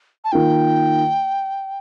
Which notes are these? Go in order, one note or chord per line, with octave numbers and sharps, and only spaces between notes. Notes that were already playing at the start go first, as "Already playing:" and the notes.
A5
D#3 A#3 F4 G5